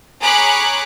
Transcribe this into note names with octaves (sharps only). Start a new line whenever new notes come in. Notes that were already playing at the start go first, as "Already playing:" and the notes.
G#4 C#5 A#5 B5 D6 F#6